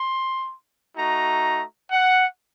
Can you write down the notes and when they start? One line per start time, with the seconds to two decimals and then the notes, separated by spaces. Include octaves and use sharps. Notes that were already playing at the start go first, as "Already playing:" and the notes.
Already playing: C6
0.95 A3 D#4 F#4 A#5
1.91 F#5